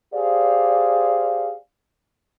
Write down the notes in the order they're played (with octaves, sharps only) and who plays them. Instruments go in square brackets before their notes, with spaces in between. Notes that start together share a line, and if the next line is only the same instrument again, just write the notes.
[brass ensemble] G4 G#4 C5 D5 F5